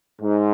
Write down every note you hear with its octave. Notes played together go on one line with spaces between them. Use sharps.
G#2